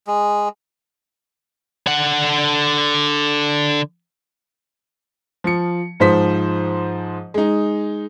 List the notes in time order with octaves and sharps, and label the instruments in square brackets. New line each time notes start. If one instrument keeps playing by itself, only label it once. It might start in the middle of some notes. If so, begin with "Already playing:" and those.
[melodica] G#3
[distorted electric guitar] D3 F#5
[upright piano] F3 C#7
G#2 F3 C5 B6
G#3 D#4